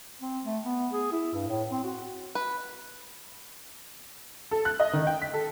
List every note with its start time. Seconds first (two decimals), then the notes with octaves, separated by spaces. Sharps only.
0.22 C4
0.45 A3
0.64 B3
0.93 G#4
1.12 E4
1.34 G2
1.48 A2
1.71 C4
1.84 F#4
2.35 B4
4.51 A4
4.65 F#6
4.80 D#5
4.93 D#3
5.07 G5
5.22 B6
5.34 A4